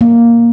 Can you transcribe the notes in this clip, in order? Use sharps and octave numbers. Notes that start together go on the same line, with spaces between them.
A#3